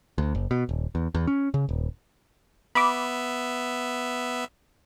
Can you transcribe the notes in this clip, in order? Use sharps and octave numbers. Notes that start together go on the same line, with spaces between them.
D2
F#1
B2
D#1
E2
E2
C#4
C#3
D#1
B3 E5 B5 D6